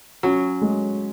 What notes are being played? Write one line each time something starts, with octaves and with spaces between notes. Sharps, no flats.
F#3 C#4
G#3